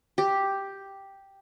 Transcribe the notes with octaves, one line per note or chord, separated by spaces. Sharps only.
G4